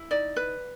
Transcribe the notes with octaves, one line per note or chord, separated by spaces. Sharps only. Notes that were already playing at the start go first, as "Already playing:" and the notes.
Already playing: E4
D#4 D5
B4